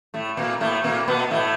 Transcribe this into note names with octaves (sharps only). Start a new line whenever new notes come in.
A2 A3
A#2 A#3
A2 A3
A#2 A#3
B2 B3
A2 A3